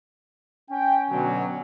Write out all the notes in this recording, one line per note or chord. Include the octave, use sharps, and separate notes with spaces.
C#4 G5
B2 D3 F#3